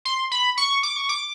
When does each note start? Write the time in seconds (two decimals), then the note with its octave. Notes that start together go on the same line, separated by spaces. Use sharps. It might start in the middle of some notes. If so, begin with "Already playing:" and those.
0.05 C6
0.31 B5
0.57 C#6
0.83 D6
0.96 C#6
1.09 D6